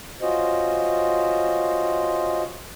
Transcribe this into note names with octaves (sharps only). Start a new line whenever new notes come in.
C#4 F4 F#4 C5 D#5